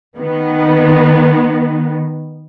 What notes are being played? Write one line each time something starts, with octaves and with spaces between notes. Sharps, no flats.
D#3 B3